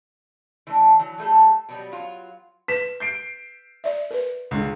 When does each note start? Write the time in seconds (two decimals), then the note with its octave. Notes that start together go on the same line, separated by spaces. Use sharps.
0.67 E3 A3 D4
0.99 E3 F#3
1.18 F#3 G3 A3 G#4 A4
1.69 B2 F#3 G3
1.92 F#3 F4
2.68 B4 B6 E7
3.00 G6 C7 D7
3.84 D5 E5
4.11 A#4 B4
4.51 C#2 D3